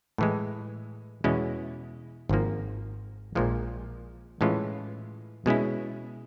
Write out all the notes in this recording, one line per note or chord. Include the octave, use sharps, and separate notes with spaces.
A2 E3 G#3
E2 B2 G#3 C#4 E4
G#1 G#2 F3 A#3
A#1 A#2 F3 G#3
A2 E3 G#3 C#4 F4
B2 G#3 C#4 E4